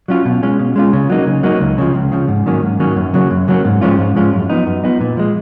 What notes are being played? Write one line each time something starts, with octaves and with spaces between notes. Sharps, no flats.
F#3 C#4 F4
B2
G#3 C#4 F4
B2
G#3 C#4 F4
C#3
F#3 A#3 D#4
C#3
F#3 A#3 D#4
C#2
C#3 F3
C#2
C#3 F3
G#2
D#3 F#3 A#3 C#4
G#2
D#3 F#3 A#3 C#4
F#2
C#3 F#3 A#3
F#2
C#3 F#3 A#3
G#2
F3 G#3 C#4 F4
G#2
F3 G#3 C#4 F4
F#2
F3 B3 D#4
F#2
F3 B3 D#4
A#2
F3 G#3